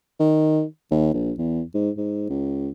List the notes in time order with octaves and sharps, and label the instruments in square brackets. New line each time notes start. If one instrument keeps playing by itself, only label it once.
[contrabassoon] D#3
D#2
A#1
E2
G#2
G#2
C#2